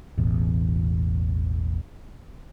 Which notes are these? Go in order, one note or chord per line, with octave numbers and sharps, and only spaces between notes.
E1 A1 E2